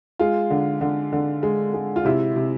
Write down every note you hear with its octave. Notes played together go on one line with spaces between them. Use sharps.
G#3 F4
D3
D3
D3
G#3
G#3
F4
C3 E4
C3